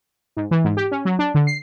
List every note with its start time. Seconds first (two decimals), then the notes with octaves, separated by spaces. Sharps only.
0.36 G#2
0.51 E3
0.64 G#2
0.77 G4
0.91 C#4
1.05 F#3
1.19 D4
1.35 D3
1.47 C7